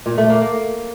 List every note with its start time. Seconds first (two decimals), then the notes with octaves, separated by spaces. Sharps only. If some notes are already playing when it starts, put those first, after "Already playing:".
0.06 A#2
0.18 A3
0.29 A#3
0.41 A#3